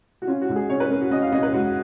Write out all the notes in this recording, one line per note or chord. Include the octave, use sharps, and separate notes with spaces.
F#4
C#4 F4
F#4
G#2
G#4
C#4 C#5
B4
C#4 A#4
F#4
C#4 D#5
F5
C#4 D#5
B4
G#2 F#4